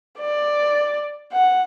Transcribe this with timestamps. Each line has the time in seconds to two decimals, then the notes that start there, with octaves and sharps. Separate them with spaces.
0.18 D5
1.32 F#5